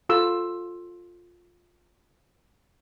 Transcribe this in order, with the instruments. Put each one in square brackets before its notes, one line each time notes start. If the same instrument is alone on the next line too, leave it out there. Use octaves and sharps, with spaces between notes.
[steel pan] F4 A4 E6